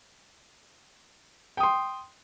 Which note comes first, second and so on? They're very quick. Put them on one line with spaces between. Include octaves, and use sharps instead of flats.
G5 D#6 C6